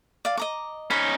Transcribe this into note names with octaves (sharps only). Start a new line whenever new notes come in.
D5 F5
D#5 A#5 D6
C#4 D#4 B5